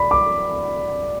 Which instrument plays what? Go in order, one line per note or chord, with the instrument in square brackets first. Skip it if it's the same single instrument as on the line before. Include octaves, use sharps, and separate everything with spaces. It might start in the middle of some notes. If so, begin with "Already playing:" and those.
Already playing: [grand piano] D5 B5
D6